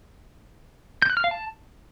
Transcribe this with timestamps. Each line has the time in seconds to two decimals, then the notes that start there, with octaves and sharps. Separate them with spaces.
1.02 G6
1.10 F#6
1.17 F6
1.24 F5
1.31 A5